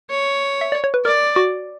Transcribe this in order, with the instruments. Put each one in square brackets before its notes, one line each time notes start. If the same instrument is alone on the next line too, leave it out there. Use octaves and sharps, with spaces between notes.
[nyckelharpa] C#5
[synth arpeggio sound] E5
D5
C#5
B4
[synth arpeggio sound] A#4 [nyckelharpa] D5
[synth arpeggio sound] F#4